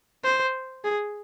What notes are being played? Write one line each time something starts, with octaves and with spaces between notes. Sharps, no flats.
C5
G#4